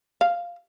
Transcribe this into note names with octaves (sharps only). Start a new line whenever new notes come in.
F5